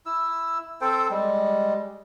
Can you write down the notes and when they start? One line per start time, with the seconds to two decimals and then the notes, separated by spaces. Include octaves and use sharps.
0.06 E4 E6
0.81 C4 A4 C5 G5
1.10 G3 G#3